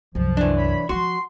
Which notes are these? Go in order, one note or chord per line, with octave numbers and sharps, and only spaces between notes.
C2 F#2 F3
E3 D4
C#5 B5
E3 F3 F#4 C6